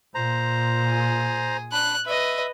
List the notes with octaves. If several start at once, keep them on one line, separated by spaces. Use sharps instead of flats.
A#2 C5 A#5
G#4
D4 B5 F#6
B4 D#5 E5